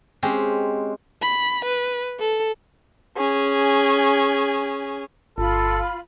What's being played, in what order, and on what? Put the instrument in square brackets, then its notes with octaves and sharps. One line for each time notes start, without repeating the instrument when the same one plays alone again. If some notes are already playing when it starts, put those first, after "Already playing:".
[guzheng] G#3 C4 C#4 G4
[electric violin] B5
B4
A4
[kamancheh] C#4 G#4
[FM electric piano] G1 [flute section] F4 B5 [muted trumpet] A4